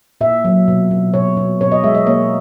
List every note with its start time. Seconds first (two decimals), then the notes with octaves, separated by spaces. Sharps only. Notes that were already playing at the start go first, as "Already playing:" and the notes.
0.21 A#2 E5
0.45 F#3
0.68 B2
0.91 B2
1.14 B2 C#5
1.37 B2
1.61 B2 C#5
1.72 D#5
1.84 G#3 E5
1.95 D#5
2.07 A#3 C#5